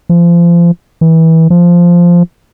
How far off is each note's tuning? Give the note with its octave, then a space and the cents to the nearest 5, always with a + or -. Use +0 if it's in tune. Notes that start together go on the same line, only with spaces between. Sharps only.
F3 -30
E3 -25
F3 -5